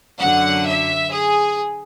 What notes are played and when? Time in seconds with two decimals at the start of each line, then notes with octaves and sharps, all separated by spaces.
0.19 F#2 D3 F#3 F#5
0.66 E5
1.11 G#4